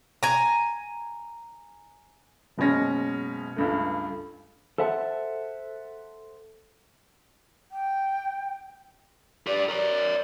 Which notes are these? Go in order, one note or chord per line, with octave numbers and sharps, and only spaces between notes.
G#5 A#5
F#1 B2 G#3 C#4 A#6
C#2 G2 A3
A4 C5 E5 F#5 G5 A5
G5
G4 B4 D5
A#4 C#5 D5